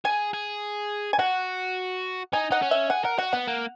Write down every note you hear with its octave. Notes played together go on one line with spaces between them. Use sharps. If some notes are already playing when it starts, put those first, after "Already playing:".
G#4 G#5
G#4
G#5
F#4 F#5
D#4 G#5
D#4 F#5
C#4
E5
G#4 F#5
A#4 F#5
F#4 F#5
B3 F#5
A#3